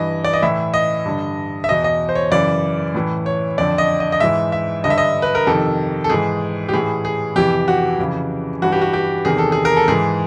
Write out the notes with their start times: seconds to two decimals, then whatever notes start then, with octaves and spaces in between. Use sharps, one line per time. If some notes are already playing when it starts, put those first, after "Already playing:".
Already playing: G2 E3 D#5
0.24 D5
0.33 D#5
0.43 A2 E3 E5
0.74 D#5
1.05 G2 D3
1.64 E5
1.69 E2 B2 D#5
1.84 D#5
2.09 C5
2.15 C#5
2.32 F#2 C#3 E3 D5
2.94 A2 E3
3.26 C#5
3.58 F2 D3 D5
3.78 D#5
4.00 D#5
4.12 D#5
4.20 G#2 E3 E5
4.52 E5
4.84 G2 D3 D#5
4.90 E5
4.98 D#5
5.22 B4
5.35 A#4
5.47 F2 C3 D#3 A4
6.04 A4
6.10 G#2 E3 G#4
6.69 G4
6.73 A2 E3 G#4
7.05 G#4
7.36 F2 C3 E3 G4
7.68 F#4
7.99 F2 C#3 E3
8.62 G2 E3 F#4
8.72 G4
8.81 F#4
8.93 G4
9.25 E2 C3 D#3 G#4
9.38 A4
9.52 G#4
9.65 A#4
9.77 A4
9.88 G#2 E3 G#4